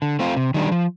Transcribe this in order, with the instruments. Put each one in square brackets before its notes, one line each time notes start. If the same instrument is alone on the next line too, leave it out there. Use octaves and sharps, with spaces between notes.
[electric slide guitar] D3
A3 C4 F4
C3
D#3 G3 D4
F3